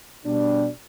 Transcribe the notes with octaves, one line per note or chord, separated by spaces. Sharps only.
B2 G3 D4